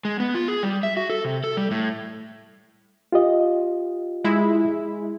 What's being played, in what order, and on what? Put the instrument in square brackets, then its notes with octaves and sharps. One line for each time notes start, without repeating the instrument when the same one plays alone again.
[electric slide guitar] G#3
B3
F4
G#4
G3
E5
F#4
A4
C3
A4
G3
A2
[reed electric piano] F4 G4 D#5
[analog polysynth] G#3 E4